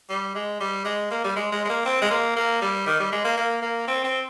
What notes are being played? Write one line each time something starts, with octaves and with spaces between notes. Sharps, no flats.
G3
G#3
G3
G#3
A#3
G3
G#3
G#3
G#3
A#3
C4
G#3
A#3
A#3
G3
D#3
G3
G#3
A#3
A#3
A#3
C4
C4